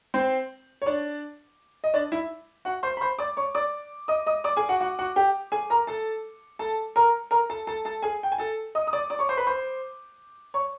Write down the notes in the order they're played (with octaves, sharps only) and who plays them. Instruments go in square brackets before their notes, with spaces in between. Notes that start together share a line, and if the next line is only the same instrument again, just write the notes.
[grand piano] C4 C5
C#5
D4 D5
D#5
D4 D5
E4 E5
F#4 F#5
C5 C6
B5
C5 C6
D5 D6
C#5 C#6
D5 D6
D#5 D#6
D#5 D#6
D5 D6
G#4 G#5
F#4 F#5
F#4 F#5
F#4 F#5
G4 G5
G#4 G#5
A#4 A#5
A4 A5
A4 A5
A#4 A#5
A#4 A#5
A4 A5
A4 A5
A4 A5
G#4 G#5
G5
G#5
A4 A5
D#5 D#6
D#6
D5 D6
D5 D6
C#5 C#6
C5 C6
B4 B5
C5 C6
C#5 C#6